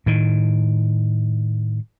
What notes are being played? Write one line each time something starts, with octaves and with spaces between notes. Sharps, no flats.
A2 D#3